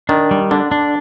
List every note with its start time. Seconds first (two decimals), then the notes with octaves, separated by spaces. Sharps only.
0.09 D#3 D4
0.31 G3
0.51 D3 D4
0.71 D4